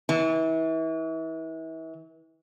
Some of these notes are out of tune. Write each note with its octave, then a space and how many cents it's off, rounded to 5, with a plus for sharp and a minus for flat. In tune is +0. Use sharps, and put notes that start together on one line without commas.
E3 -35